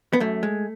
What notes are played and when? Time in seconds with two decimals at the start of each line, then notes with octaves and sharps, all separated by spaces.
0.13 B3
0.20 F#2 A3
0.43 G#3